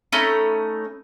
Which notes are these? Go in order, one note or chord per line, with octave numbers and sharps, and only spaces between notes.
A3 C#4 D#4 B5